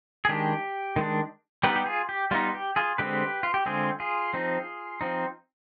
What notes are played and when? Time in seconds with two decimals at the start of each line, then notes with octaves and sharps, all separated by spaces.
0.25 G#4
0.29 D#3 G#3 D4 G4
0.96 D#3 G#3 D4
1.63 G3 B3 D#4 G4 B4
1.76 G4
1.86 F4 G#4
2.09 G4
2.31 G3 B3 D#4 F4
2.54 G4
2.76 F4 G#4
2.98 D3 G#3 C4 G4 B4
3.43 F4
3.54 G4
3.66 D3 G#3 C4 F4 G#4
4.00 F4 G#4
4.34 F3 C4 D#4
5.01 F3 C4 D#4